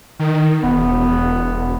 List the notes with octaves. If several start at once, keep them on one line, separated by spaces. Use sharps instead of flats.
D#3
E1 B3